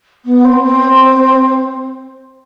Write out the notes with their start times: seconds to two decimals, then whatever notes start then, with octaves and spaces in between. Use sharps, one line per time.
0.25 B3
0.44 C4
0.63 C4